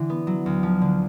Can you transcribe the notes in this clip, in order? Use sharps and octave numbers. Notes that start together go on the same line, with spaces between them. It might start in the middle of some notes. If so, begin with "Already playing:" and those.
Already playing: D3 E3
B3
F#3
D2
F3
D3